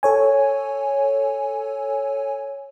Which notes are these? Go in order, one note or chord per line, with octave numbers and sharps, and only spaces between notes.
A4 C#5 G#5